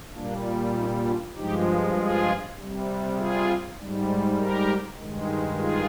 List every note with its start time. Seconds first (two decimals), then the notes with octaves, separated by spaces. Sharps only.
0.15 A#2 G3 A#3 D4
0.76 C4 D#4
1.06 D4 F4
1.36 G2 F3 G#3 D#4 G4
1.96 F4 G#4
2.56 C3 G3
3.16 F4 G#4
3.77 G#2 G3
4.37 G4 A#4
4.98 G2 D#3 G#3
5.58 F4 G#4